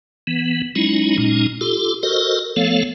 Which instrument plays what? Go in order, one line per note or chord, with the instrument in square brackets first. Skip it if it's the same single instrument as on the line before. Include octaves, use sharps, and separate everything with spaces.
[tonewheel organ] E3 B3
F#3 G#3 C#4 D#4 E4
A#2 G#3 C#4 D#4
F4 G4 A4
F#4 A4 A#4 C5 D#5
F3 A3 B3 A4 C#5 F5